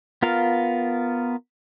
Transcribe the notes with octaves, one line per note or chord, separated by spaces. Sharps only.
B3 F4 A#4 F5